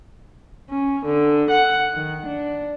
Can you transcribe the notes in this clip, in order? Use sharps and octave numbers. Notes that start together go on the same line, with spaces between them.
C#4
D3
F#5
D#3
D4